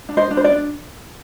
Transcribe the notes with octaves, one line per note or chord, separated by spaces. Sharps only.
D4
C5 D#5
D4
C5
D5
D4